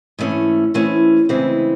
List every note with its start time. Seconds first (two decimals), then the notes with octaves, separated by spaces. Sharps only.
0.19 G#2 E3 A3 C#4
0.74 G#2 E3 A3 C#4
1.29 D2 C#3 E3 G#3 C4